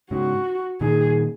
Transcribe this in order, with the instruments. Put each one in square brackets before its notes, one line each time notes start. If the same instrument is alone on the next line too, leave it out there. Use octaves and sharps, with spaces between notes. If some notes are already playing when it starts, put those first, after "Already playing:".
[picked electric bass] G#2 C#3 [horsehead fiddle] F#4
[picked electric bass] A#2 D#3 [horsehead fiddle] G#4